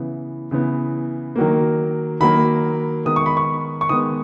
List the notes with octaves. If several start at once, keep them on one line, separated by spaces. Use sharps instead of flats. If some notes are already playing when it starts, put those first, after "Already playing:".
Already playing: C#3 E3 B3
C#3 E3 B3
D#3 F#3 A#3
D#3 F#3 A#3 B5
D#3 G#3 B3 D#6
C#6
B5
C#6
C#6
D#3 G#3 B3 D#6